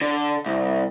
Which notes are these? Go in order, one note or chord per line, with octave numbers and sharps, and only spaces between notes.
D3
C2